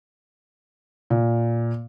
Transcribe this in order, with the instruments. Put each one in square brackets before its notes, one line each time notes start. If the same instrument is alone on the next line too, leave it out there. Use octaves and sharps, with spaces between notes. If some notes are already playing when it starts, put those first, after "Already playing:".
[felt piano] A#2